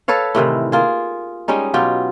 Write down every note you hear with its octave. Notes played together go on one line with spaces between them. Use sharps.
A4 B4 C#5 F5
A2 C3 D#3 E3
A#3 F4 G#4
G3 G#3 C#4 D#4
B2 F#3 F4 G4